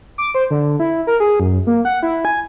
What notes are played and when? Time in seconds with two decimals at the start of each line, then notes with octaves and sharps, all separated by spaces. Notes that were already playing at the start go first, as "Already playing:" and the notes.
0.18 D6
0.35 C5
0.51 D3
0.80 E4
1.07 A#4
1.20 G#4
1.40 F#2
1.67 A#3
1.85 F#5
2.03 E4
2.25 G#5